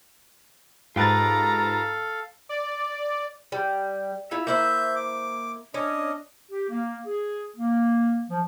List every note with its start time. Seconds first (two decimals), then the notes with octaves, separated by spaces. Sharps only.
0.96 G#2 F4 G4 A4 B4 F5 A#5 A6
2.49 D5
3.52 G3
4.31 E4 F4 E5
4.47 A#3 E4 C5 E5 G6
4.96 D6
5.74 C#4 D4 D#5
6.50 G4
6.69 A#3
7.06 G#4
7.56 A#3
8.30 F3